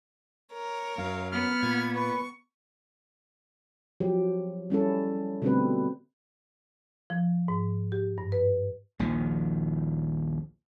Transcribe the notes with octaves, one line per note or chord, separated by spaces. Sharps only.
A#4 C#5
F#2 F5
B3 F6
A#2 G#6
B4 C#6
F3 F#3 G4
G3 C#4 E4 A4
B2 D3 G3 A3 C4 B4
F3
G#2
G4
G2
B4
A#1 D#2 D#3 F3